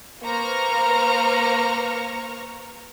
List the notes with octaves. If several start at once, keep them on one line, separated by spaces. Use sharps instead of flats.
A#3 B4 C5 A#5 C#6 F6